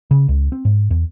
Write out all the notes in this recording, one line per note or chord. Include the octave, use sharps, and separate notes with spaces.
C#3
C#2
C4
G#2
E2